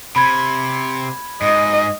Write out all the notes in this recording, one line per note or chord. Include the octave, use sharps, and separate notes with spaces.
C3 B5 G#6
G#2 D#5